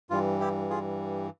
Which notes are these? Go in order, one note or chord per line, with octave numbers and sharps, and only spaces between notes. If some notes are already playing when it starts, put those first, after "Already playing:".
G2 E3 G3 F4
E4 G4
F4 G#4